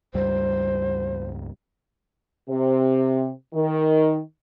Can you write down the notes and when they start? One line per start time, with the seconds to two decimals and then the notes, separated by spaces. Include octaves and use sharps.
0.14 C#2 G2 G3 C5
2.49 C3
3.53 D#3